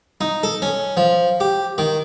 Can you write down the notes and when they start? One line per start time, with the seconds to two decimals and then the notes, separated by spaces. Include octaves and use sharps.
0.21 D#4
0.43 A4
0.62 C#4
0.97 F3
1.40 G4
1.78 D#3